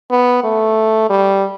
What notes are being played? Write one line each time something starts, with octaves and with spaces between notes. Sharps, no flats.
B3
A3
G3